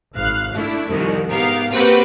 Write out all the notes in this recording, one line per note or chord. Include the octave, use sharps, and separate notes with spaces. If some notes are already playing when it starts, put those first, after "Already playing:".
G#1 F5 F#6
A3 D4 E4
C2 F2 D#3
G#2 B3 G4 A#4 F5 F6
A#3 C4 F#4 G4 B4 F#5